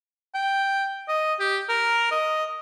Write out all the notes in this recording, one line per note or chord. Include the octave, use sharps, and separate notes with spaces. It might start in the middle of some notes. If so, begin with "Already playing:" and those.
G5
D#5
G4
A#4
D#5